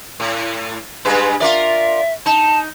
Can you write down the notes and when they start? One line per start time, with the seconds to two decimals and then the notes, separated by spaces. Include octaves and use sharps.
0.20 A2
1.05 G2 G#3 B4
1.40 F4 A#4 D5 E5
2.26 D#4 A5